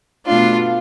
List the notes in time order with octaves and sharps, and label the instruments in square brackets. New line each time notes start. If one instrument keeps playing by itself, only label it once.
[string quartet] B2 A3 D4 F4